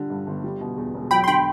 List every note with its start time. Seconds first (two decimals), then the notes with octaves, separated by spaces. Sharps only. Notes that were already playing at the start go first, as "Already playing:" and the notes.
Already playing: D3 G3
0.10 G2
0.27 G1
0.44 G3
0.61 B2
0.77 E2
0.94 E1
1.11 F#3 G5 B5
1.24 C6
1.28 D3 G5 B5